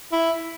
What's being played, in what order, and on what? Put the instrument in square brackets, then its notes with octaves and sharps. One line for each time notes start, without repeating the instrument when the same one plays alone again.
[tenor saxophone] E4